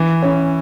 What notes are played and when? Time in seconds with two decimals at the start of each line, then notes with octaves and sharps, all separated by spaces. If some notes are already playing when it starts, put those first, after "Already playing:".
Already playing: E3
0.22 C#4